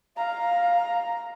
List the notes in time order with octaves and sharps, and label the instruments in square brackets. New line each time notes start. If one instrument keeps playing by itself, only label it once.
[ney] F5 [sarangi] A#5